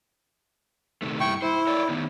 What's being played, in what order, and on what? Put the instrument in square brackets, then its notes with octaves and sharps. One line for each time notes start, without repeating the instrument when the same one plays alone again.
[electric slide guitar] C3 D#3 A3
[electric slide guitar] G2 E4 [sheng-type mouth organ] G5 C#6
[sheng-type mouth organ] E4 [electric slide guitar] C5
[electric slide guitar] A#4 C#5 D5
D#3 B3 D#4